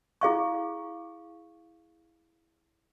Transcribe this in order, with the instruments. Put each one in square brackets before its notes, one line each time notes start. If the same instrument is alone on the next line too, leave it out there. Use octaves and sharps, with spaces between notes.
[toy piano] E4 G#4 F5 C#6